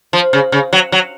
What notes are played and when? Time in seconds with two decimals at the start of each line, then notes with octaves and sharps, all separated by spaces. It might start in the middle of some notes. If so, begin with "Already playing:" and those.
0.13 F3
0.33 C#3
0.52 C#3
0.73 F#3
0.92 F#3